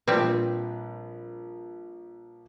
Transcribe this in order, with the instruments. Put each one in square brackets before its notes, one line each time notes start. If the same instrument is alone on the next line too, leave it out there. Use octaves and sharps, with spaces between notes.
[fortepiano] A#1 B4 [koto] G3 C4